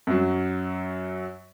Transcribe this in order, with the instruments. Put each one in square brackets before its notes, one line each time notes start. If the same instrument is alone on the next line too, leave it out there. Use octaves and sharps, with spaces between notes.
[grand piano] F#2 F#3